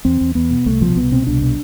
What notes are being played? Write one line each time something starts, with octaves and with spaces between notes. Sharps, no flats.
E2 C4
E2
E2 B3
B2
C2 A3
B2 F3
C2 B3
B2 C4
C2 D4
B2